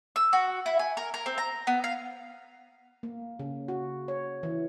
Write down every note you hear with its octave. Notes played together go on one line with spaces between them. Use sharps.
E6
F#4
E4
G#5
A#4
A#4
C4
A#5
B3
F5
A#3
C#3
F#4
C#5
E3